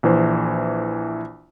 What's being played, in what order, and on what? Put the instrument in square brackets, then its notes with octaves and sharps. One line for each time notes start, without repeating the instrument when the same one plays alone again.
[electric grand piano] A#1 E3 C5